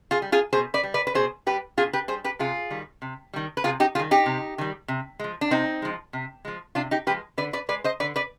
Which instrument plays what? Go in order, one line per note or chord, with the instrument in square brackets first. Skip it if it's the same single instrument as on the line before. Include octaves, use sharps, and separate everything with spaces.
[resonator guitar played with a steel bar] F4 G#4
G3
F4 G#4
B2 G#4 C5
B4 D5
G3
B4 D5
B4
B2 G#4 C5
G3 G4 B4
B2 F4 G#4
G4 B4
G3 G#4 C5
G4 B4
C3 F4 G#4
D#3 G3
C3
D#3 G3
B4
C3 F4 G#4
D#4 G4
G3 F4 G#4
D#3
D#4 G4
C3
D#3 G3
C3
F3 G#3
D4
C3 C4 D#4
F3 G#3
C3
F3 G#3
C3 D4 F4
D#4 G4
F3 G4 B4
G#3
D3 B4 D5
B4 D5
G#3 B4 D5
C5 D#5
D3 B4 D5
B4 D5